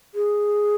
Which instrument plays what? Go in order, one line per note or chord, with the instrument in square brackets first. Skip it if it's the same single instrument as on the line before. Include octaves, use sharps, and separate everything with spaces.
[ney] G#4